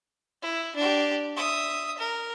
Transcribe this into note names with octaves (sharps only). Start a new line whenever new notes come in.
E4
D4 G4
E5 D#6
A#4